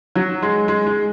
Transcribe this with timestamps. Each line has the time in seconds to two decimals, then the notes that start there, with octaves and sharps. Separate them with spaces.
0.15 F#3
0.42 G#3
0.68 G#3
0.87 G#3